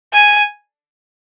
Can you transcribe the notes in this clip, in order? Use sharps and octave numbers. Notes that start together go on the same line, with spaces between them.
G#5